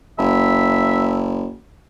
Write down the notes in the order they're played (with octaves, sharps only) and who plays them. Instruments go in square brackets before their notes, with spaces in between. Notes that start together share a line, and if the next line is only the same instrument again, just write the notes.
[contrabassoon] F#1 [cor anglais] E5